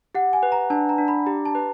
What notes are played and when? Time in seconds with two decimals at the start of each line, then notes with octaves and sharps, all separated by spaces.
0.15 G4 F#5
0.33 G#5
0.43 B4
0.52 A#5
0.70 D4 A5
0.89 A#5
0.98 D4
1.08 B5
1.26 G4 A#5
1.45 A5
1.55 B4